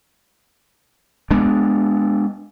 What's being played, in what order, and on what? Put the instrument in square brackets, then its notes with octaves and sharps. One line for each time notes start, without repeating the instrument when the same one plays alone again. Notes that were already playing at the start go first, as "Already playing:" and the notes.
[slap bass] G#3 B3 D4